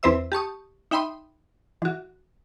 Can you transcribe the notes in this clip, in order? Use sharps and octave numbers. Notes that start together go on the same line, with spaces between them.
E2 C4 B4 C5 E5 E6
G4 A5 C#6 D#6
D#4 E5 G5 B5 C6 D#6
E3 F#4